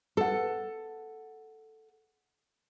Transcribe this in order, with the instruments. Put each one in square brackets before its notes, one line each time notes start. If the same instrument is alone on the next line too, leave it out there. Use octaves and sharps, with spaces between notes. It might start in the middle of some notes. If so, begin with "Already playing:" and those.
[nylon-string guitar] A4 F#5